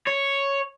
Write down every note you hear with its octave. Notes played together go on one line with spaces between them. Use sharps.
C#5